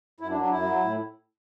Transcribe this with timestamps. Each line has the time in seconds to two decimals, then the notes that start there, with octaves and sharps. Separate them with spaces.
0.20 F#2 E4
0.30 D4
0.35 F#3
0.41 D4
0.51 F#2 E4
0.66 F#3
0.80 A2